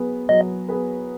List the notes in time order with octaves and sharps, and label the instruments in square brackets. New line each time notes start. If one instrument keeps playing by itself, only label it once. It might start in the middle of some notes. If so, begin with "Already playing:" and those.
Already playing: [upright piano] F#3 B3 G#4 B4
[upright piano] F#3 [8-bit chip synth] D#5
[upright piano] B3 G#4 B4